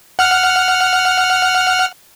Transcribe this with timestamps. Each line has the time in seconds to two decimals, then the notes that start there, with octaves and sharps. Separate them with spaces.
0.19 F#5 F6